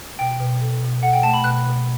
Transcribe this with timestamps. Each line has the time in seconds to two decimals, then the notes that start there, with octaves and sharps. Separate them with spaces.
0.19 B2 G5
0.39 B2
0.61 A4
0.82 B2
1.02 A4 F#5
1.13 G5
1.23 A3 A5
1.34 B5
1.44 B2 F#6
1.65 B2